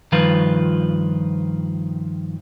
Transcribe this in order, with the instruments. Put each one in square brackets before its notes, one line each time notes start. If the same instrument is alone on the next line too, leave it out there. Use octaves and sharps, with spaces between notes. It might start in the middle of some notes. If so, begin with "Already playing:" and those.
[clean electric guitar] G2 D#3 F3 F4 B4